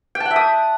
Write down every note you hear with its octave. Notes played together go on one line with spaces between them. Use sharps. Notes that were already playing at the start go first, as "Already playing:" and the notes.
G5
A5
F#5
E5
D#6